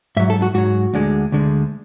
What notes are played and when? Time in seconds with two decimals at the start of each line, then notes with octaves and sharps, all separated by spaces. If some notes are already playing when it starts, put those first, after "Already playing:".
0.17 G#2 E5
0.20 F#3
0.30 A4
0.42 F#4
0.54 G#2 F#3 F#4
0.94 D2 D3 G#3
1.32 D2 D3 G#3